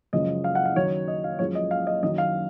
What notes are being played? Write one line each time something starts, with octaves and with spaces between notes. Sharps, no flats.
F#2 C#3 F3 G#3 D#5
F5
F#5
F5
F#2 D#3 F#3 C#5
D#5
F5
F#2 F3 G#3 C#5
D#5
F5
D#5
F#2 D#3 F#3 D#5
F5